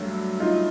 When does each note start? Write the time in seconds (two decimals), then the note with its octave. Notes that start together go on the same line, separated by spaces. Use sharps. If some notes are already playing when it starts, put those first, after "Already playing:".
Already playing: G2 D3 F#3 A3
0.40 D#4 F4